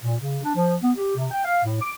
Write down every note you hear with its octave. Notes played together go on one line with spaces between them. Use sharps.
A#2
C#3
D4
F3
B3
G4
C3
G5
F5
A2
D6